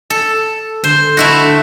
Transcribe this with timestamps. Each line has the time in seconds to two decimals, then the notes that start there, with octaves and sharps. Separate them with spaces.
0.10 A4
0.84 D3 C5
1.17 A3 E4 F#4